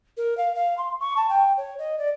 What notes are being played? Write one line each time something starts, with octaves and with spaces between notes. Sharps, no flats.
A#4
F5
F5
C6
C#6
A5
G5
C#5
D#5
D5